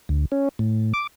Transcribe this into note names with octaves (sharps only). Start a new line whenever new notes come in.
D2
C#4
A2
D6